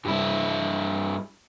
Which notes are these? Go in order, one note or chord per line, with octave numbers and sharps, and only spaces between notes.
G2 E4